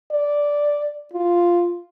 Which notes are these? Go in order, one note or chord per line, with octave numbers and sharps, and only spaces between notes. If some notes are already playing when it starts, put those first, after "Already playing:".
D5
F4